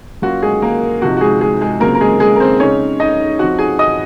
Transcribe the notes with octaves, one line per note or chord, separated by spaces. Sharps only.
F#3 A#3 C#4 F4 F#4
G#3 G#4
A#3 A#4
C3 F3 C4 D#4 F#4
F#4
G#3 G#4
G#3 G#4
G#3 G#4
C#3 F#3 A#3 C4 F4 A#4
A#4
G#3 G#4
G#3 G#4
A#4
C4 C5
C#3 G#3 C4 C#4 D#4 C#5
D#4 D#5
F3 C4 D#4 F#4 F#5
G#4 G#5
D#5 D#6